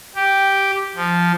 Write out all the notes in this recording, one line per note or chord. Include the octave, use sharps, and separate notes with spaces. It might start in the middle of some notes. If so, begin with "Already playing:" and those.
G4
F3